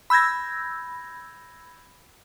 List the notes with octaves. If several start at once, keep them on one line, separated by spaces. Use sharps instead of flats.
B5 E6 G6 G#6 A#6